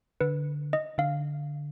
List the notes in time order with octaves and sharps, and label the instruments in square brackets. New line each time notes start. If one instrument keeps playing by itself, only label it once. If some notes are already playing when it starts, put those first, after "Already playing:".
[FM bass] D3 [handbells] B4
[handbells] D#5
[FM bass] D3 [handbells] F5